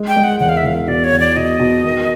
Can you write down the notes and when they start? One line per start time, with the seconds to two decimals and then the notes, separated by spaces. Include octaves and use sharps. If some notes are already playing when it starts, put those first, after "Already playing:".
Already playing: G#3
0.08 G5
0.16 G#3
0.24 F#5
0.40 E1 F#5
0.49 F5
0.57 E5
0.64 E1 F5
0.88 B2 D5
1.04 C#5
1.13 E2
1.20 D5
1.36 B2 D#5
1.60 B2
1.84 D#3